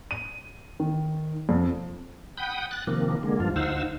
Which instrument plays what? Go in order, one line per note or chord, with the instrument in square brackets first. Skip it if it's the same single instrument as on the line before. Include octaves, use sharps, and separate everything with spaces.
[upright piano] D#7
D#3
F2
[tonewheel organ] F#5 G5 B5 D#6 G6
F#6 A6
C3 D#3 F3 A#3
D3 G#3 A#3
G2 F3 F4
D2 D#4 C5 F5 F#5 E6